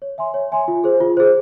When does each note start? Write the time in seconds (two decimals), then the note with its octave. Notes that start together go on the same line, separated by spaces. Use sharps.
0.02 C#5
0.18 E5 G#5 C6
0.34 C#5
0.52 E5 G#5 C6
0.68 F4
0.84 G#4 C5
1.00 F4
1.17 G#4 C5